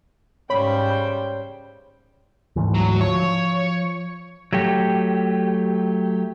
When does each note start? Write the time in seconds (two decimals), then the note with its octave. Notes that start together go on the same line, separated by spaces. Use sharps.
0.50 G#2 C#3 G3 C5 C#5 G5 B5
2.56 D2 G#2 E3
2.74 F#3
3.01 F3 C#5
4.53 F#3 A3 G4